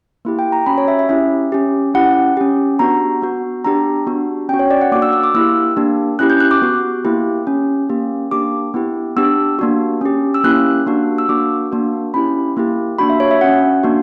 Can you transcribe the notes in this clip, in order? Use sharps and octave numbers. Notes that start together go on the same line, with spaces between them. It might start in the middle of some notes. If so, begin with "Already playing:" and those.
A#3 E4 G4
G5
A#5
C#4 F#4 B5
C#5
E5
E5
C#4 E4 G4 E5
C#4 G4
C#4 E4 G4 F#5
C#4 G4
B3 D4 F#4 A#5
B3 F#4
B3 D4 G4 A#5
B3 D4 F#4
C#4 F#4 G5
C#5
D5
F#5
A#3 D4 F#4 D6
E6
E6
D6
A#3 E4 G4 E6
A#3 D4 G4
C#4 E4 G4 F#6
G6
F#6
D6
B3 F#4
A#3 E4 G4
C#4 G4
A#3 C#4 G4
A#3 D4 G4 D6
B3 E4 G4
B3 D4 G4 E6
A#3 D4 F#4
C#4 G4
E6
A#3 C#4 E4 G4 F#6
A#3 D4 F#4
E6
A#3 D4 F#4 D6
A#3 D4 F#4
C#4 E4 G4 B5
A#3 E4 G4
A#3 D4 F#4 B5
E5
C#5
E5
C#4 F#4 F#5
A#3 D4 F#4